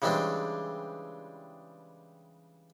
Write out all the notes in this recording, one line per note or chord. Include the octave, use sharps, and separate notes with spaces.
C#3 E3 G3 G#3 C4 D4